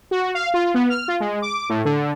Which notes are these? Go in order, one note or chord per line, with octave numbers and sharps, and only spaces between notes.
F#4
F5
F4
B3
F6
F4
G#3
D6
A2
D3